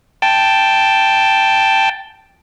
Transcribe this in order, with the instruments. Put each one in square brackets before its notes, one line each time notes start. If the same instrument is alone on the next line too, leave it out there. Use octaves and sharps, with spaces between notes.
[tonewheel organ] G5 A5